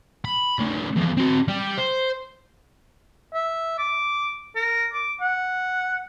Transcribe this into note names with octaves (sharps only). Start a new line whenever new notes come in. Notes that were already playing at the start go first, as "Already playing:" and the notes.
B5
C#3 A3
E2 F3
C4 F#4
G3 G4
C5
E5
D6
A#4
D6
F#5